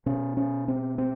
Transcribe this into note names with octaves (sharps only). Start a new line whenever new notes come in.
B2 C#4
C#4
C4
C4